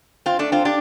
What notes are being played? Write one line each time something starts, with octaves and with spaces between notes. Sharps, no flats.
C4 F4
A3 D4
C4 F4
D4 G4